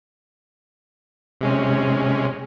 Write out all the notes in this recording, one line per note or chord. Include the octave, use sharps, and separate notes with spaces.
C3 G#3 C#4